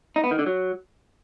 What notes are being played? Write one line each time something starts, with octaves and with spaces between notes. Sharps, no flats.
D#4
B3
D#3
D3
F#3